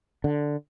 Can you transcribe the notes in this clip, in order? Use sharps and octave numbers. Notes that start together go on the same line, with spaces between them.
D3